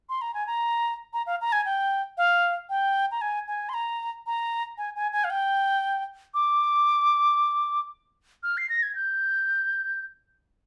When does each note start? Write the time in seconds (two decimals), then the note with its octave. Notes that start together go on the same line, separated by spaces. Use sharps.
0.09 C6
0.21 A#5
0.34 G#5
0.47 A#5
1.13 A#5
1.27 F5
1.41 A#5
1.52 G#5
1.65 G5
2.18 F5
2.69 G5
3.11 A#5
3.21 G#5
3.48 G#5
3.69 C6
3.74 A#5
4.26 A#5
4.78 G#5
4.96 G#5
5.13 G#5
5.24 F5
5.30 G5
6.34 D6
8.43 F6
8.58 C7
8.69 A#6
8.83 G#6
8.95 G6